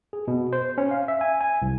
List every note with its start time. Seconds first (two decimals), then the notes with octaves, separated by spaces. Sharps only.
0.13 G#4
0.28 B2
0.53 C5
0.78 C#4
0.91 F5
1.08 E5
1.21 G#5
1.41 G#5
1.62 C2